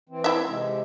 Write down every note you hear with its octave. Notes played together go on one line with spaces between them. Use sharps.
E3 C4
E4 E5
C3 G#3